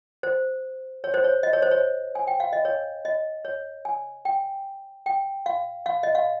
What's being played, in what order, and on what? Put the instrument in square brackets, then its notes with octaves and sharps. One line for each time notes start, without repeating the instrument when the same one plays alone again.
[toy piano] C5
C#5
C5
C#5
D#5
C#5
C5
C#5
G#5
G5
F5
D#5
C#5
D#5
C#5
G#5
G5
G5
F5
F5
D#5
F5